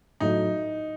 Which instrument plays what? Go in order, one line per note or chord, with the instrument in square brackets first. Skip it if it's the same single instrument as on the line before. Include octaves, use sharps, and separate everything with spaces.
[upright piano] A2 F#3 A3 [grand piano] D#4